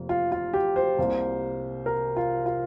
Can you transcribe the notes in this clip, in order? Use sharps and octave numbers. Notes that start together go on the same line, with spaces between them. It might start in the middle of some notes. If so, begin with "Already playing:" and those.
Already playing: F1 F2 C3 A#3
F4
F4
G4
C5
C2 C3 A#3
A#4
F4
F4